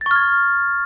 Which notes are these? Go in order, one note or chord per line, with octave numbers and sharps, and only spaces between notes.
C#6 F6 G#6 A6